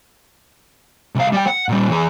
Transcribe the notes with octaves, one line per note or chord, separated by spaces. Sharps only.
C2 F5
G3 G5
F#5
A#2 G3
E3 G#4